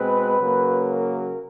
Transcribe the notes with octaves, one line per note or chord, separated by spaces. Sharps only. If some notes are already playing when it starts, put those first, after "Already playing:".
Already playing: B2 G#3 C4 B4
C#3 F#3 A#3
A#4